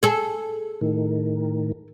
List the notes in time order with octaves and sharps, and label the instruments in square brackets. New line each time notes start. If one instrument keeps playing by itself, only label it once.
[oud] G#4 A4
[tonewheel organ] A2 D#3